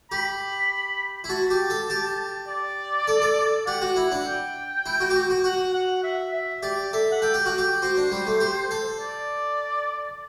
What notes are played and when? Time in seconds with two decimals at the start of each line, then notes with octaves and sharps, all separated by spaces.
0.11 G4 B5
1.24 E4
1.29 F#4 A5
1.50 G4
1.70 A4
1.90 G4
2.48 D5
3.08 A4
3.22 A4
3.66 G4 F#5
3.82 F#4
3.96 E4
4.11 D4
4.27 G5
4.86 E4
5.00 F#4
5.10 G4
5.15 F#4
5.30 F#4
5.44 F#4 F#5
5.74 F#5
6.03 E5
6.33 E5
6.63 G4 D5
6.93 A4 E5
7.12 F#5
7.22 A4 G5
7.34 G4
7.46 F#4 F#5
7.52 G5
7.58 G4
7.82 F#4 C5
7.97 D4
8.12 G3
8.27 A3
8.40 G4
8.71 A4
9.00 D5